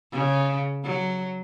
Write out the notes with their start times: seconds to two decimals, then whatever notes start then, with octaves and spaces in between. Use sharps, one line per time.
0.12 C#3
0.84 F#3